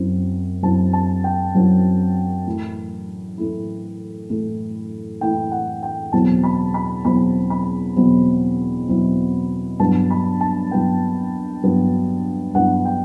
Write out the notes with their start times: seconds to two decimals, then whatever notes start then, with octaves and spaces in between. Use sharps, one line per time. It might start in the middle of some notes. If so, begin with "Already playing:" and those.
Already playing: F#2 F#3 C4 E4
0.63 F#2 F#3 C4 E4 A5
0.93 A5
1.24 G5
1.55 F#2 F#3 C4 E4
2.46 A2 E3 A3 E4
3.38 A2 E3 A3 E4
4.30 A2 E3 A3 E4
5.21 A2 E3 A3 E4 G5
5.52 F#5
5.83 G5
6.12 E2 B2 F#3 C4 E4 A5
6.43 B5
6.74 B5
7.05 E2 B2 F#3 C4 E4 B5
7.50 B5
7.96 E2 B2 F#3 C4 E4
8.88 E2 B2 F#3 C4 E4
9.80 G2 F#3 B3 E4 A5
10.10 B5
10.41 A5
10.71 G2 F#3 B3 E4 G5
11.63 G2 F#3 B3 E4
12.54 G2 F#3 B3 E4 F#5
12.85 G5